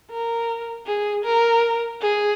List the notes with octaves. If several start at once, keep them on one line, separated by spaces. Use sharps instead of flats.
A#4
G#4
A#4
G#4